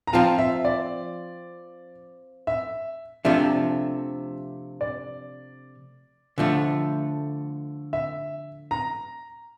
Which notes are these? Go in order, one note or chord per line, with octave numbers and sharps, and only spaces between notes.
A#5
F3 C4 F4 A5
E5
D5
E5
C3 F3 A3 D4 E5
D5
D3 F3 A3
E5
A#5